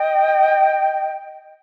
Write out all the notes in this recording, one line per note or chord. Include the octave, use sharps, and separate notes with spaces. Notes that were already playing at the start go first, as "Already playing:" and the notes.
Already playing: D#5 G5